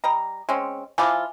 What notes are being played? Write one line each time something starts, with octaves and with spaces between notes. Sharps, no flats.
G3 D#5 A#5
G#3 C4 C#4
F3 E4 F4 G#5 D6